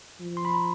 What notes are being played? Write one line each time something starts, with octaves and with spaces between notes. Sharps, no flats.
F3
C6
B5
A#5